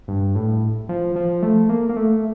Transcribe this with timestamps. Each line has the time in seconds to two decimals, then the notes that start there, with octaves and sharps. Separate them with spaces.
0.08 G2
0.35 A2
0.89 F3
1.16 F3
1.43 A3
1.69 A#3
1.89 A#3
1.96 A3